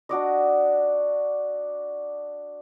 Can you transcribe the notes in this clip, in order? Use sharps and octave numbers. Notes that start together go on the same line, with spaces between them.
D4 F#4 D5 D#5